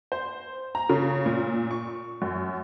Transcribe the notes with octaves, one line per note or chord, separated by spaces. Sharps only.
C5
A#5
C#3
A#2
C#6
F#2